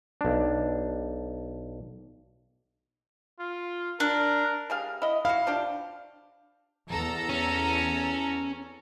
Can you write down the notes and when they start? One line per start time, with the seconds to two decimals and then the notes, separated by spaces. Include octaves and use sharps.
0.21 B1 D4
3.40 F4
4.00 D4 A#4
4.70 G3 G#4 F5
5.02 E4 D#5
5.25 E4 F#4 F5
5.47 F3 D4 G4
6.89 E2 A4 A#5
7.29 C#4